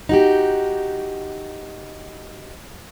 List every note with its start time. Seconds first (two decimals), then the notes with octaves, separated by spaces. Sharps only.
0.09 D#4 F#4 G4